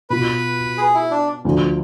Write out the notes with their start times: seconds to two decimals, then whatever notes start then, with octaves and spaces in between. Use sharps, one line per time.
0.10 B2 B3 F4 B4
0.78 G#4
0.95 E4
1.11 D4
1.45 D2 D3 F3